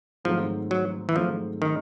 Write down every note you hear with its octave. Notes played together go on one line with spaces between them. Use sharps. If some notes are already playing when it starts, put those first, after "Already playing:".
G#2 D#3 F3 F#3 A3 C4
F#3
E3
G#2 D#3 F3 F#3 A3 C4
D#3